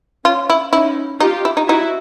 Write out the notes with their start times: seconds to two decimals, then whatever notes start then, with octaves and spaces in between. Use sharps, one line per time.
0.24 C#4 F4
0.50 E4
0.73 C#4 D#4 E4
1.20 D#4 F4 G4
1.45 E4
1.57 D#4
1.68 D#4 E4 F#4